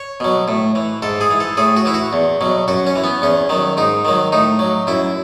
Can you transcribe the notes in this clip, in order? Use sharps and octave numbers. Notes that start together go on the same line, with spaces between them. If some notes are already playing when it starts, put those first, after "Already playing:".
Already playing: C#5
B2 F#3
A2
E3
G#2 A4
G#4
E3
A4
A2 G#4
F#4
E3 E4
F#4
E2
B2 F#3
F#2 F#4
C#4
E3
B3
E2 C#4
D#3 F#3
G#2 D#4
D#3 F#3
A2 D#4
F#3
F#2 E4